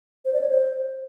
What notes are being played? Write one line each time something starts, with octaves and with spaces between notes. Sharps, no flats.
C5
D5
C#5
C5